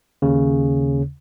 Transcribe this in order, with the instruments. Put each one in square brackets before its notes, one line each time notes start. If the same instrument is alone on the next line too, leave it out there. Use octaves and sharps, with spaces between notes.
[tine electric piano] D#2 C#3